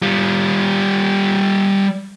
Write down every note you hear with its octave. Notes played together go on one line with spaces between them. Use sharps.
G3 F4